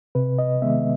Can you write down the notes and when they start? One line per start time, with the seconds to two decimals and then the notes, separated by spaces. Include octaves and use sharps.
0.15 C3 B4
0.39 D#5
0.62 D#3 G#3 B3 E5